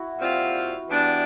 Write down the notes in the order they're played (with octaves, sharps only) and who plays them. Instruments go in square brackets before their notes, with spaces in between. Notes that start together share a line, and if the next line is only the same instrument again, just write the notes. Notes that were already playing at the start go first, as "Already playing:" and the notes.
Already playing: [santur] E4 F#4
[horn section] A#2 G3 C4 F4
E3 G3 B3 D4